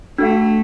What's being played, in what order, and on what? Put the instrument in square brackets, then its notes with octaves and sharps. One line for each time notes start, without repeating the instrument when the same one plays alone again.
[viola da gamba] A3 [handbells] D4 F#4 A4 F5